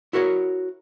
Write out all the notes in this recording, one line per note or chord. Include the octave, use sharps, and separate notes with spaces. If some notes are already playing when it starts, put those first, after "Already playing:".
E4 F#4 A#4 C#5